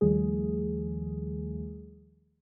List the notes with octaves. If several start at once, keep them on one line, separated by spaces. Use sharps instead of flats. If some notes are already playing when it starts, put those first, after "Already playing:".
D#2 D#3 F3 G3 A3 G#4